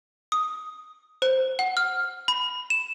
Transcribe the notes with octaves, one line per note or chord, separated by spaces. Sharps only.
D#6
C5
F#5
F6
B5
E7